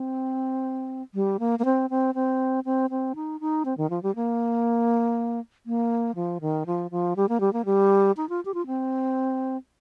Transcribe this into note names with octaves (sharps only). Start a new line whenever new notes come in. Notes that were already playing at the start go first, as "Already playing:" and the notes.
Already playing: C4
G3
A#3
A#3
C4
C4
C4
C4
C4
D#4
D#4
C4
D#3
F3
G3
A#3
A#3
F3
D#3
F3
F3
G3
A#3
G3
A#3
G3
D#4
F4
G4
F4
C4